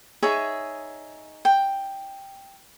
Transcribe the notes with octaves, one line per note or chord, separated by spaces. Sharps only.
D#4 G#4 C#5 E5
G5